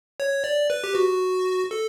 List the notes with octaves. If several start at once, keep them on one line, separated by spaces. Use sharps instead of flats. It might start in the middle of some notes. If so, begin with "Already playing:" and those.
C#5
D5
B4
G4
F#4
A4